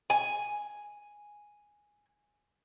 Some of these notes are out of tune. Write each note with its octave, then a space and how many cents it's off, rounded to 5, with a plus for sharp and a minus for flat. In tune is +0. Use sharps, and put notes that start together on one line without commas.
G#5 +0